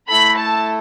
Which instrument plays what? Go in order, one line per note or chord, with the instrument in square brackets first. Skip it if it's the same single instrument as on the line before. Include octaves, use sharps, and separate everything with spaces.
[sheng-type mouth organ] A3 E4 A4 [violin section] B5
[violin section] A5